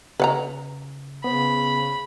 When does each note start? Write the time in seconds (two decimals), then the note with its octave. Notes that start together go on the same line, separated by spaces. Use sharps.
0.20 C#3 B4 F#5 A#5
1.24 C#3 B3 C5 B5